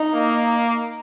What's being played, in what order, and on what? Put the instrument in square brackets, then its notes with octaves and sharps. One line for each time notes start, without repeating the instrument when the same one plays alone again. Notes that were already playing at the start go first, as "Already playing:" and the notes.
Already playing: [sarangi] D#4
[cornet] A#3